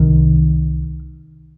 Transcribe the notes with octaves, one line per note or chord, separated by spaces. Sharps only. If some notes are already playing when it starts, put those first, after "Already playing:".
Already playing: C2 C3 D#3